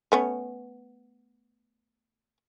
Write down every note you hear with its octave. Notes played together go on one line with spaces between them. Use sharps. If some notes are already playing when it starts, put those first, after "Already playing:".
A3 B3 C#4